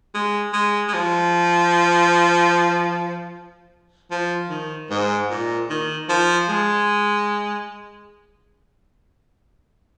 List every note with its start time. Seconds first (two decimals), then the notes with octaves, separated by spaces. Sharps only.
0.14 G#3
0.53 G#3
0.88 G#3
0.94 F3
4.11 F3
4.50 D#3
4.90 G#2
5.30 A#2
5.70 D#3
6.09 F3
6.49 G#3